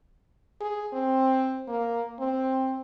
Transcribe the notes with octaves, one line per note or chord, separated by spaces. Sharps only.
G#4
C4
A#3
C4